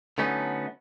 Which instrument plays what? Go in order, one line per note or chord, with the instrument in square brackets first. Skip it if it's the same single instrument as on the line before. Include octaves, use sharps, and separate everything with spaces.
[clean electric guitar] D3 F#3 A3 B3 C#4 D#4